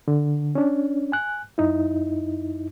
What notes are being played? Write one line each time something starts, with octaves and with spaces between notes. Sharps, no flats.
D3
C#4 D4
G#5 F#6
F#2 D#4 E4